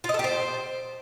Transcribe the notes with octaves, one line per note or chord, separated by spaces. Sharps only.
F4
D#5
A4
G4
C5